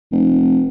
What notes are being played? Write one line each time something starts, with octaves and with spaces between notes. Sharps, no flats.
F1